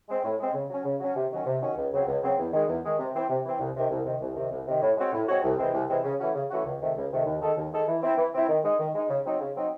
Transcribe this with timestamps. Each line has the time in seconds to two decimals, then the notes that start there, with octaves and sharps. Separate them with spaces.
0.09 G#3 C4
0.24 A2
0.40 G#3 C4
0.54 C#3
0.70 F#3 C#4
0.85 C#3
1.00 F#3 C#4
1.16 C3
1.31 D#3 F#3 C#4
1.46 C3
1.62 D#3 F#3 C#4
1.77 C#2
1.92 C#3 F#3 C4
2.08 C#2
2.23 C#3 F#3 C4
2.38 E2
2.53 D#3 G#3
2.68 E2
2.84 D#3 G#3
2.99 C3
3.14 E3 C4
3.30 C3
3.45 E3 C4
3.60 C2
3.75 C3 D#3
3.91 C2
4.06 C3 D#3
4.21 C2
4.36 C3 D#3
4.51 C2
4.67 C3 D#3
4.82 A2
4.97 G#3 C4 F#4 C#5
5.13 A2
5.28 G#3 C4 F#4 C#5
5.44 C2
5.59 C3 E3 G#3 C4
5.73 C2
5.89 C3 E3 G#3 C4
6.05 C#3
6.20 E3 A3 C#4 F#4
6.35 C#3
6.51 E3 A3 C#4 F#4
6.66 C#2
6.81 C3 D#3 A3
6.96 C#2
7.12 C3 D#3 A3
7.26 D#2
7.42 D#3 G#3 D#4 A4
7.57 D#2
7.73 D#3 G#3 D#4 A4
7.88 E3
8.03 C4 E4
8.18 E3
8.34 C4 E4
8.49 D#3
8.64 G#3 D#4
8.80 D#3
8.95 G#3 D#4
9.10 C#3
9.25 F#3 C4 D#4
9.41 C#3
9.56 F#3 C4 D#4